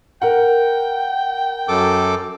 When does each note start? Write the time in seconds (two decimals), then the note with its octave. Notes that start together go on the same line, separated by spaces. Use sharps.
0.22 A#4 F#5 G5
1.68 F#2 A4 D6